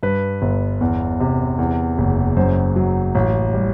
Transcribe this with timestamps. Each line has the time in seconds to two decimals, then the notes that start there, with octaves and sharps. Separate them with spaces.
0.03 G2 B4
0.42 G1
0.81 E2
1.20 C3
1.59 E2
1.98 F#1
2.37 F#2 C5
2.76 F#3
3.15 A1
3.54 G3